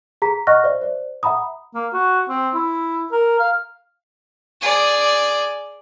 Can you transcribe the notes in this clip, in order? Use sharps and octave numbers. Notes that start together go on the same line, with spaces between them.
G#4 A#5 B6
D#5 F#5 C#6 F6 F#6 A#6
C5 D5 E5
C5 D5
E5 F#5 A#5 B5 D#6
A#3
F#4
C4
E4
A#4
F5
G#4 D5